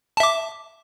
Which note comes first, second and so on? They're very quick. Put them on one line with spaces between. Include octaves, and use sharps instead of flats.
A5 E5 D6